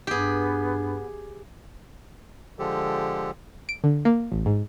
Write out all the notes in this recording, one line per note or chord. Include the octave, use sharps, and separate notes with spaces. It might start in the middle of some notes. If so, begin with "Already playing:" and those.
G2 B3 G4 G#4
D3 F3 G#3 G4 A4
D7
D3
A#3
A1
G#2